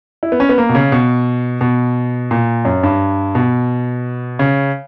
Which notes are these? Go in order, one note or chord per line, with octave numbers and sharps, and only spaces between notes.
E4
B3
C#4
B3
A#3
B2
C#3
B2
B2
A#2
F#2
G2
B2
C#3